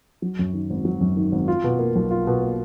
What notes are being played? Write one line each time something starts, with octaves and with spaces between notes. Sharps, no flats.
F#3
F#2
D#3
G#1
F#3
F#2
D#3
G#1
F4
B2
A#3
B1
F4
B2
A#3